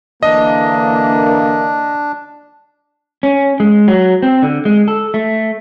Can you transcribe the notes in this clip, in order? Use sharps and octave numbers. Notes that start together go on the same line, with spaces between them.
D3 E3 A#3 D4 D#5
C#4
G#3
F#3
C4
D3
G#3
A4
A3